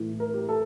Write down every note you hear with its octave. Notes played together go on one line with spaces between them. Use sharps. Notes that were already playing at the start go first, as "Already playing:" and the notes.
Already playing: A2 E3
A#4
G4
A4